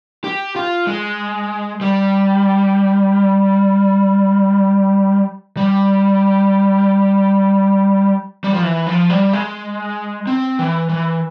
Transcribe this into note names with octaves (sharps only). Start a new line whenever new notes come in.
G4
F4
G#3
G3
G3
G3
F3
E3
F3
G3
G#3
C4
E3
E3